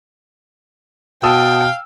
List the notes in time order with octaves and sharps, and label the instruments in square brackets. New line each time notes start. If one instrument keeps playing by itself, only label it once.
[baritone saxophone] B2 [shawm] F5 [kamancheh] G5 [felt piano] A5 D#6 E6